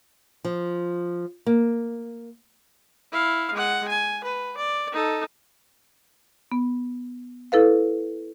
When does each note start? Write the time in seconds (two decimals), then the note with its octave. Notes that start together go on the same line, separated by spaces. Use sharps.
0.45 F3
1.46 A#3
3.12 E4 F5
3.53 G#3 F#5
3.88 G#5
4.24 B4
4.57 D5
4.92 D#4 A4
6.52 B3
7.52 E4 A4 B4 F5